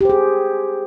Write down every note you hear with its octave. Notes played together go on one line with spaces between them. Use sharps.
G4 G#4 C5